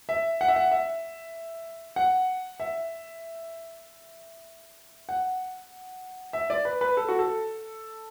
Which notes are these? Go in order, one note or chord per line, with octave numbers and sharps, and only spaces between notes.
E5
F#5
E5
F#5
E5
F#5
E5
F#5
E5
D5
B4
B4
A4
F#4
A4